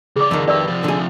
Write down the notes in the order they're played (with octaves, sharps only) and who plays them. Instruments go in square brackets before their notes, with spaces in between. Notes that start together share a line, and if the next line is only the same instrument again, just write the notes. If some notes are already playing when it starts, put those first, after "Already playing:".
[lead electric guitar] C#3 D5 [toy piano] G#4 D6
[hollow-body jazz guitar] F2 D#3
[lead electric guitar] G4 B4 [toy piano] D5 E5 E6
[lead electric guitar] C3 F3
[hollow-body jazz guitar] D3 G#4